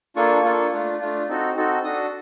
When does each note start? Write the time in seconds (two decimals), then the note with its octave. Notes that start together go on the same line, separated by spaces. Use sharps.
0.16 A#3 D4 F4 A4 C#6
0.44 A#3 D4 F4 A4
0.72 A3 D4 F4
1.01 A3 D4 F4
1.29 C4 D#4 F#4 A4
1.56 C4 D#4 F#4 A4
1.84 D4 F#4 A4 D#6